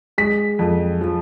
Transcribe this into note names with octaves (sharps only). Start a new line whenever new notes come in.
G#3 B6
F2
F3